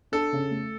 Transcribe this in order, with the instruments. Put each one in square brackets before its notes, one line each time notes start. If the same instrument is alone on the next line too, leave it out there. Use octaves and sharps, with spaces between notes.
[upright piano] D4 [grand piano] A4
[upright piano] C#3
A3